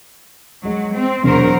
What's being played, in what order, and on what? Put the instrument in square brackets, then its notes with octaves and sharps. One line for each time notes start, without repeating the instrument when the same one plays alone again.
[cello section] F#3 [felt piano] G#3
[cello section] C4
[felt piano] E1 [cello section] F#3 A#4 C5